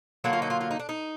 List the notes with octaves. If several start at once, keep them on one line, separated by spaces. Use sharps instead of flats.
D3 F#3 A#3 F#4
F4
D#4
F4
F4
D#4
D4
D#4